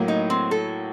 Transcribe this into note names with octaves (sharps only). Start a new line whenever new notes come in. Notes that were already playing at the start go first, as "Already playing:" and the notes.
Already playing: A2 F#3 A#3
D#4
C4
A4